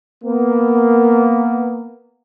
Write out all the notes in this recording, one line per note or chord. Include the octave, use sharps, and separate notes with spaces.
A#3 B3